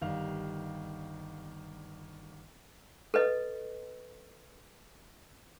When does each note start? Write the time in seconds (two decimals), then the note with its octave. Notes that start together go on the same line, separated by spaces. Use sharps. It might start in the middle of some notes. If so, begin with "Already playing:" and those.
0.01 G1 D#3 G3 F5 F7
3.14 A4 B4 D#5